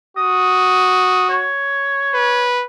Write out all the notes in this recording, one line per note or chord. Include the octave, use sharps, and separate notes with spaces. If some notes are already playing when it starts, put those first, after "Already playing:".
F#4 D#6
C#5
B4